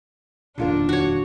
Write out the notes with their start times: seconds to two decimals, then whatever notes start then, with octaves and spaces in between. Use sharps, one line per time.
0.58 D#1 F2 B2 D4 D#4 F4 A#4
0.89 F#4 C#5